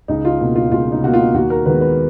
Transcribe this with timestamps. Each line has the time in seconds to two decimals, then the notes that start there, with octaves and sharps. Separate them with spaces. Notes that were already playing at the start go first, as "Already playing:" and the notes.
0.08 C#2 D#4
0.25 F4
0.40 B2 A#3
0.56 F4
0.71 C#2 F4
0.92 D#4
1.03 B2 A#3 F#4
1.14 F4
1.34 D#2 F#4
1.50 A#4
1.66 D#3 G#3 B3 B4
1.81 B4